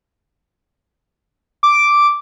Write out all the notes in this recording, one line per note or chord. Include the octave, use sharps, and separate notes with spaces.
D6